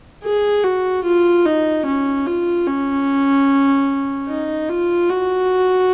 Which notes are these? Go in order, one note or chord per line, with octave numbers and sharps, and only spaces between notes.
G#4
F#4
F4
D#4
C#4
F4
C#4
D#4
F4
F#4